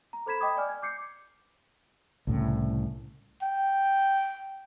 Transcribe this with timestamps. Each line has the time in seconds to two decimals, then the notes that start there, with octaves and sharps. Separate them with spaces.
0.13 A#5
0.26 A4 C5 B5 G#6 B6 E7
0.40 D#5 G5 B5 D6 D#6 G#6
0.57 D5 G#5 F6
0.69 G#6
0.82 D6 G6 C7 C#7
2.27 C2 A2 C#3
3.42 G5